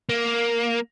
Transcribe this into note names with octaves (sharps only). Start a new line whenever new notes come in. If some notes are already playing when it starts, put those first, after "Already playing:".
A#3